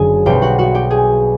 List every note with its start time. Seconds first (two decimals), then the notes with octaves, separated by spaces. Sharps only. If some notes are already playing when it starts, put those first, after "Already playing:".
Already playing: F#1 F#2 D3 G#4 G#5
0.26 B1 B2 G3 C4 G4 G5
0.42 F#4 F#5
0.58 F#4 F#5
0.75 G4 G5
0.90 G#4 G#5